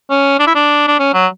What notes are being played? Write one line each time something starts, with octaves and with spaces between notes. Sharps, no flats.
C#4
D4
E4
D4
D4
C#4
F#3